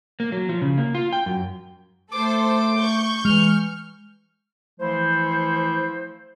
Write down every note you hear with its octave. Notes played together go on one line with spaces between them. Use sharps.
A#3
F#3
F3
C#3
A#3
F4
G5
F#2
A3 A4 C5 D6
C#6 G6
E3 G#3 F6
E3 F3 A3 E4 C5